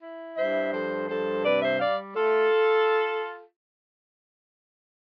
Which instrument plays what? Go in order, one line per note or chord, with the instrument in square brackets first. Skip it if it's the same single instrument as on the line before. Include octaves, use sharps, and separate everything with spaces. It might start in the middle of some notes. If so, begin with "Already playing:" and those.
[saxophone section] E4
G2 C5 E5
F3 A4 C5
G2 A4 C5
C3 B4 D5
C5 E5
G3 D5 F5
A3 F4 A4